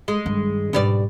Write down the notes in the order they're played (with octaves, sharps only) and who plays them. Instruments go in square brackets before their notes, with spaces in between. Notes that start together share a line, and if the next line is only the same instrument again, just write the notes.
[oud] G#3
[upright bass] G2 D#3
[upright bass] G#2 D4 [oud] B2 G3 D5